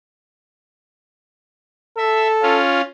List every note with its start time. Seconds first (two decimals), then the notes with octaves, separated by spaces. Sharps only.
1.98 A4 E5
2.42 C#4 F4